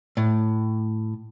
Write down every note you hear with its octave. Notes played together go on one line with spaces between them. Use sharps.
A2